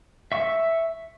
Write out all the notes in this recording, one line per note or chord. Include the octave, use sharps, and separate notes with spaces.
E5 C#6